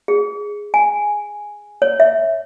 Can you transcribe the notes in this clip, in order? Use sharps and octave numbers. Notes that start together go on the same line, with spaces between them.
G#4
G#5
C#5
E5